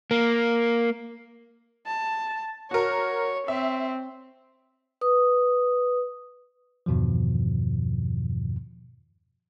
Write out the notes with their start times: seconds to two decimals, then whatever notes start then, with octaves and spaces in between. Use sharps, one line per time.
0.11 A#3
1.86 A5
2.71 F#4 A#4 C#5
3.48 C4 E5
5.01 B4 D#6
6.86 E2 G2 B2 D#3 F3